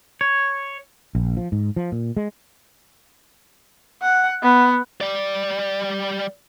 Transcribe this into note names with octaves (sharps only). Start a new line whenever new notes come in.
C#5
A#1
F3
G#2
F3
A#2
G#3
F#5
B3
G3 D5